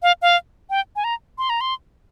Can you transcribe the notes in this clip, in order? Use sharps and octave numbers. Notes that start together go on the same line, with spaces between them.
F5
F5
G5
G#5
A#5
C6
A#5
C6